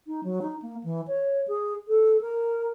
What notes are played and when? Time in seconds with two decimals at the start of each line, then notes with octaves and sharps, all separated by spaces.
0.07 D#4
0.24 F#3
0.42 D#4
0.62 A#3
0.84 E3
1.08 C#5
1.48 G#4
1.88 A4
2.21 A#4